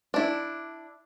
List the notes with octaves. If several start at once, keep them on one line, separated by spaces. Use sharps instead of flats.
D4 E4